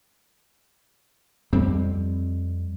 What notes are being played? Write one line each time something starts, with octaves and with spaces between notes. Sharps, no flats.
F2 G3 C4